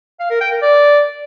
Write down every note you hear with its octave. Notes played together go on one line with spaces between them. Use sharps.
F5
A#4
G5
A#4
D5